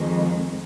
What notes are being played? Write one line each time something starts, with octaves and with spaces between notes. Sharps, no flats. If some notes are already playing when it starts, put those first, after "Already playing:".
Already playing: F2 D#3 G#3